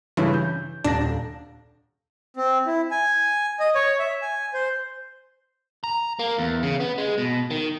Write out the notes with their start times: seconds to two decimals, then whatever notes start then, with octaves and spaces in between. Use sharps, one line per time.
0.17 G2 C#3 E3 E4
0.33 G6
0.84 D#1 D4 A#6
2.37 C4
2.66 E4
2.91 G#5
3.60 D#5
3.75 C#5
3.99 E5
4.22 G#5
4.54 C5
5.84 A#5
6.19 A#3
6.39 E2
6.63 C#3
6.80 B3
6.98 G#3
7.18 B2
7.51 D#3